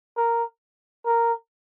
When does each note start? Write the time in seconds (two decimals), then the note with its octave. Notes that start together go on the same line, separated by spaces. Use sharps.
0.17 A#4
1.06 A#4